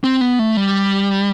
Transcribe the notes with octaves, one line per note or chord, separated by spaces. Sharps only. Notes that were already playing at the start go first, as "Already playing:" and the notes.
C4
B3
A3
G3